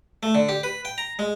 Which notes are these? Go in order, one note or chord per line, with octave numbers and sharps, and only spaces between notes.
A3
D3
G4
B4
G5
A#5
G#3